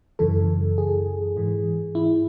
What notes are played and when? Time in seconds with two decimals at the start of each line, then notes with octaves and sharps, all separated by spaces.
0.19 F#2 C#3 E3 A4
0.78 G#4
1.37 G#2 E3
1.95 E4